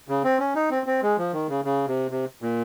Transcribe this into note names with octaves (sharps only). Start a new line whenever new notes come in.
C#3
C4
C#4
D#4
C4
C4
G#3
F3
D#3
C#3
C#3
C3
C3
A#2